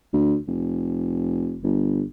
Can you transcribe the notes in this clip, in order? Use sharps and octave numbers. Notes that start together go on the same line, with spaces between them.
D2
F1
G1